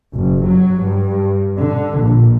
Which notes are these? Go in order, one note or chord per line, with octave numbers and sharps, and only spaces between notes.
F#1
F#3
G2
D3
A#1